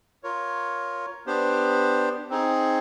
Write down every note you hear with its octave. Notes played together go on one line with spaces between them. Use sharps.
F4 A#4 C#5
B3 D4 G4 C5
C4 D#4 G#4